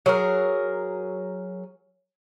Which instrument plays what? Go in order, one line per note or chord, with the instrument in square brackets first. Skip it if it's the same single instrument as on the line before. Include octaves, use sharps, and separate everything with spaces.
[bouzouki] F#3 G#4 A#4